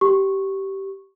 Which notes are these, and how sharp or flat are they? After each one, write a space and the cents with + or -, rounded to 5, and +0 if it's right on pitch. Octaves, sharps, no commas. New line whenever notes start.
G4 -15 C#6 -10